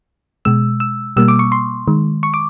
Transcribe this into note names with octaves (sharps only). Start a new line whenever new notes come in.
B2 G#3 E6
E6
B2 G3 A#3 E6
D6
C#6
C6
D#3 G#3
C#6
D6